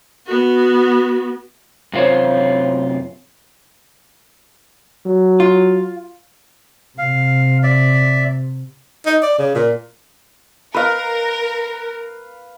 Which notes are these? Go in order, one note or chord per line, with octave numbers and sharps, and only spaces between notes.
B3 F#4
F#2 C3 F4 C5 C#5
F#3
F4
C3 F5
D5 E5
D#4
D5
C#3
A#2
A#4 B4 F5